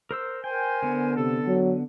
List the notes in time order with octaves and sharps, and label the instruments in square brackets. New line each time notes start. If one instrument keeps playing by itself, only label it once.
[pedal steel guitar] A#4 C5 E6
[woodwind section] A#4 C5 G#5 [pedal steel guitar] G5
[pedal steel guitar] D3 B3
[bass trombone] C3 [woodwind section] A4
[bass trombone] F#3